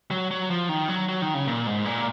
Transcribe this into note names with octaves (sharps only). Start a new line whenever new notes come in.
F#3
F#3
F3
D#3
F#3
F#3
D#3
C#3
A#2
G#2
A#2